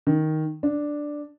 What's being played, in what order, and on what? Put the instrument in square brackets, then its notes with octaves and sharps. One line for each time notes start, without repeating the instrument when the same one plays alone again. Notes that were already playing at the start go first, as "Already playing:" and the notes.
[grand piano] D#3
D4